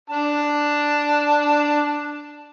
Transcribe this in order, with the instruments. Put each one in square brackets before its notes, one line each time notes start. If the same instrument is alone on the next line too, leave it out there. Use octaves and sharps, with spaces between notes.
[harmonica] D4 A5